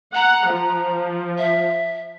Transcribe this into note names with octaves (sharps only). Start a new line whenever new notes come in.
F#5 A#5
F3
E5